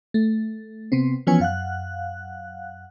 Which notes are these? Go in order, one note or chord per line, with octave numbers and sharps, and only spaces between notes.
A3
C3 B3 C4
E3 F3 B3 C#4 C#5 G#5
F#2 F5 F#5 F#6